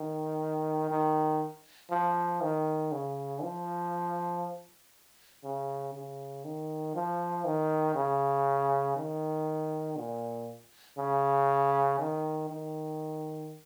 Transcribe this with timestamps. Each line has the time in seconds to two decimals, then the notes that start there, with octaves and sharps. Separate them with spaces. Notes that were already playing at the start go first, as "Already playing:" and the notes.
Already playing: D#3
0.91 D#3
1.91 F3
2.42 D#3
2.92 C#3
3.42 F3
5.44 C#3
5.94 C#3
6.45 D#3
6.95 F3
7.45 D#3
7.96 C#3
8.97 D#3
9.97 A#2
10.98 C#3
11.99 D#3
12.50 D#3